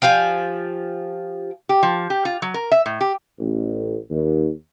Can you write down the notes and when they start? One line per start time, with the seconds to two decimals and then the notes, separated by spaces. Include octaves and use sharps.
0.02 F3 G4 F5 G#5
1.69 G4
1.83 F3
2.10 G4
2.25 F4
2.42 F#3
2.54 A#4
2.71 E5
2.86 A2
3.01 G4
3.39 A1
4.11 D#2